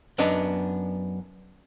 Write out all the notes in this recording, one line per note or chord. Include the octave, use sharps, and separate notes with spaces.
F#2 B3 D4 D#4